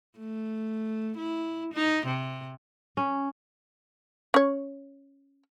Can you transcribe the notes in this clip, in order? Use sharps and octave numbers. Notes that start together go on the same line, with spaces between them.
A3
E4
D#4
C3
C#4
C#4 C#5